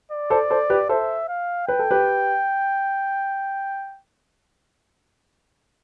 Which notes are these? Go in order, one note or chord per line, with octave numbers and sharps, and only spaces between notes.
D5
A4 C5
A4 C5
G4 B4
A4 C5 E5
F5
B4 G5
A4
G4 B4